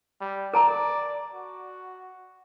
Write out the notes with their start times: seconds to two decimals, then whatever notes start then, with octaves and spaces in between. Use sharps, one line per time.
0.21 G3
0.54 A#4 D5 A5 A#5
1.34 F#4